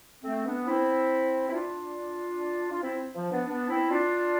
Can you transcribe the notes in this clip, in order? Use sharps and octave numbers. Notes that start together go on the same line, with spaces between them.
A3 C4
B3 D4
C4 E4
E4
D4 F4
F4
C4 E4
F3
B3 D4
B3 D4
C4 E4
D4 F4